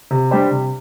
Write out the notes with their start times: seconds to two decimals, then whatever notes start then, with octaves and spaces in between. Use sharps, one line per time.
0.11 C3
0.31 G3 D4 G4 C5
0.51 C3